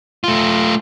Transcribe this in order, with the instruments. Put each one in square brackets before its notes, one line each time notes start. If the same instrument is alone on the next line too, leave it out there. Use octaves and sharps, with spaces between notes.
[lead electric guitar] A3 F4